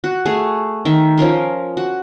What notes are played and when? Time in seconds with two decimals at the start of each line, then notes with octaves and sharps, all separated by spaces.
0.04 F#4
0.26 A3 G#4
0.85 D#3 E5
1.17 F3 C#4 A#4 C6
1.77 F#4